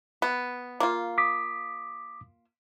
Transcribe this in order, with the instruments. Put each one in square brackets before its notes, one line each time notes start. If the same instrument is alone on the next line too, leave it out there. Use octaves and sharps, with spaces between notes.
[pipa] B3
A#3 F4
[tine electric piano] D6 D#6 B6